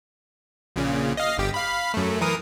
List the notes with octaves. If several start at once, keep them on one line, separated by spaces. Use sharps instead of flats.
A#1 A#2 C#3
D#5 F5
G1 G4
F5 B5
F#2 A3
E3 A#4 D#6